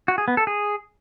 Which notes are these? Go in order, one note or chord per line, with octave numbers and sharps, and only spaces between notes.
F#4
G#4
B3
A4
G#4